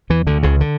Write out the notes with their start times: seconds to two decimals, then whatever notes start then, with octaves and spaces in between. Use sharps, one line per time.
0.10 E2 E3
0.27 D2 D3
0.43 C#2 C#3
0.60 D3